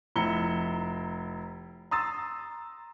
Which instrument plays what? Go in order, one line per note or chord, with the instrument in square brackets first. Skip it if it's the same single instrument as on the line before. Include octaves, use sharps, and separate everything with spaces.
[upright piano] F1 E4 A#5 C#7 G7
A#5 C6 D#6 E6 A6